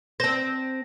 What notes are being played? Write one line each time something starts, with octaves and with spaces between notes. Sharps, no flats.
C4 C5 A5 A#6